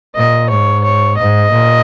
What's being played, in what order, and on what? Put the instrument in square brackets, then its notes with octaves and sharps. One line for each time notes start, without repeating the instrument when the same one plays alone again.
[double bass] A#2 [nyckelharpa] D#5
[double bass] G#2 [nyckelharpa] C#5
[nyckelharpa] C#5
[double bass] G#2 [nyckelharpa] D#5
[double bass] A#2